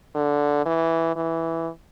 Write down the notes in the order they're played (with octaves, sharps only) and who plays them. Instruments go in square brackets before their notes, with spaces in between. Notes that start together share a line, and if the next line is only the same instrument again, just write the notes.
[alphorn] D3
E3
E3